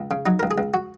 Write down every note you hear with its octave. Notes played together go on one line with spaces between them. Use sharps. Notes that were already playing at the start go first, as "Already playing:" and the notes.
Already playing: C#2
C#3
F#3 D#4
C#2 A#4
G#4
C#2
F#4